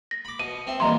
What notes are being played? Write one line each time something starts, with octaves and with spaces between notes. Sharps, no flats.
A#6
B5 D6
B2 D#7
C4 E5
A#1 E3 G3 D#5 A#5 C6